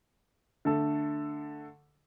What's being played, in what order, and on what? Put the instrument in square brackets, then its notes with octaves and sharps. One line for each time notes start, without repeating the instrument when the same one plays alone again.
[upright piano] D3 A3 A4